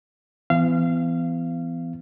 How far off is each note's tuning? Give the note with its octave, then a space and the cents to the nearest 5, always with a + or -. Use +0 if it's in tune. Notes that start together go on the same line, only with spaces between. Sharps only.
E3 +25 B3 +40 F5 -25